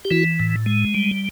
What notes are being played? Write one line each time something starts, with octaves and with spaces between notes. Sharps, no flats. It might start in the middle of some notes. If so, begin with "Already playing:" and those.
G4
E3 E4 F#4
A2
G#3
G3